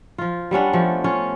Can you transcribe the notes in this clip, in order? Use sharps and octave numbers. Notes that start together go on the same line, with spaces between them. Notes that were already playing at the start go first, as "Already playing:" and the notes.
F3 F4
G3 B3 C#4 D4
F3 A3
C#4 F4 C#5